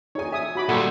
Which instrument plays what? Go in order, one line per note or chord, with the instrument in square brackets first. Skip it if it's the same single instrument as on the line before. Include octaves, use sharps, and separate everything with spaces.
[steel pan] D#4 G#4 [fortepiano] C#5 G#5
[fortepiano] E5 [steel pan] G#5 D#6
[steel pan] F#4 B5 D6
[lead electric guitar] A#2 G3 [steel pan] A4 [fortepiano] F#5 B5 C6